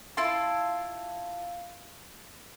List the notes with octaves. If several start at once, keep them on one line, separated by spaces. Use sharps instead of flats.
E4 F4 A5 C6